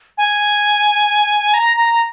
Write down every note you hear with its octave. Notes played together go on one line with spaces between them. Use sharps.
G#5
A#5
A#5